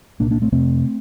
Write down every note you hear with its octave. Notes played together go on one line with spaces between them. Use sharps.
C2 A#2 A#3 D4
A#3 D4
A3 C4
F2 C3 A3 C4